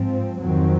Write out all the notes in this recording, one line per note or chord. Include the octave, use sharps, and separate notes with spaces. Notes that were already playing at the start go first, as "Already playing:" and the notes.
Already playing: G#2 F3 C4
F2 D#3 F#3 C4